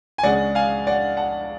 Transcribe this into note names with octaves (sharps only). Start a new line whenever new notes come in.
G#5
C#2 C#3 G#3 D5 F#5
F5 G#5
D5 F#5
F#5 A5